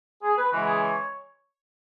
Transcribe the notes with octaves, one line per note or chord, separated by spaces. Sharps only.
G#4
B4
C#3 E3 G#3 F#4
G#4
C#5